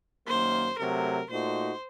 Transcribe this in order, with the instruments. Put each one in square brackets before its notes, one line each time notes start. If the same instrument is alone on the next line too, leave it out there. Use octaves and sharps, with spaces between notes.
[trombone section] F#2 D#3 A#3 [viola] C5
[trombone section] C3 F#3 A3 [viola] A#4
[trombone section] A#2 A3 D#4 F#4 [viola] C5